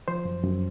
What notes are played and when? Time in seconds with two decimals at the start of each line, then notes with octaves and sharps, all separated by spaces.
0.08 F3 C5
0.25 F#2
0.43 F#2